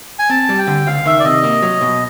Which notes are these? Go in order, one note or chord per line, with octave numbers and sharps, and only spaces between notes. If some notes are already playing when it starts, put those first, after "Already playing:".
G#5
C4 A5
G3
G5
D3
C#2 F5
D#3 E5
D5
C3 D#5
A#3
F#3
B2